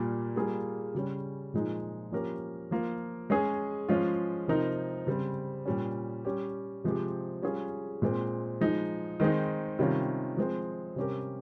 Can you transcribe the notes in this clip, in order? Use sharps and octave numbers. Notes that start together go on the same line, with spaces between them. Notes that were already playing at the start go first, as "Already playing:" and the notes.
Already playing: A#2 G3 A#3
G3 A#3 F4 G#4
C#3 G3 C#4
A#2 F3 G#3 D#4
F3 A#3 C#4 G4 A#4
F3 A#3 F4
G#3 C#4 G#4
F3 G#3 C#4 F4
C3 F3 C4 D#4 A#4
C#3 G3 C4
A#2 G3 C#4
G3 C#4 G4
C3 F3 G#3 C4 G4
G3 C#4 F4 G#4
A#2 G#3 C4
F3 G#3 D#4
D#3 G#3 C4 D#4
C3 D#3 G3 C#4 F4
F3 G#3 C4
C3 G3 C#4 G4 A#4